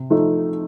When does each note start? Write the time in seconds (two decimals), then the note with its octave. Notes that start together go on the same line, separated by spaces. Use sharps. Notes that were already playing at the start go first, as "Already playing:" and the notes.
Already playing: C3
0.10 F3 A3 D#4